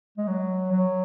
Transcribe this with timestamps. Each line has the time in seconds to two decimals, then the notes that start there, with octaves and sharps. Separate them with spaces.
0.18 G#3
0.27 F#3
0.72 F#3